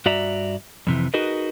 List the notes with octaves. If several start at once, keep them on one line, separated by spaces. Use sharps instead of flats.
G2 F#4 D5 E5 A#5
F2 C3 E3
D#4 F#4 G#4 A#4 B4 D#5